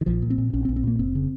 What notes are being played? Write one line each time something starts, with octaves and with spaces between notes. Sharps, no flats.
D#3
A#1 F3
A#2
C4
A#2
A#1 C#4
C4
A#1
C4
A#2 A#3
F1 C4
C#3